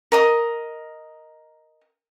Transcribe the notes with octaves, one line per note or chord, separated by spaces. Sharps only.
A#4 D#5 D#6